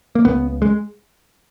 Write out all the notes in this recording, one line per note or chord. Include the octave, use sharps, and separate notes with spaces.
A#3
C#2 C#3 B3
G#3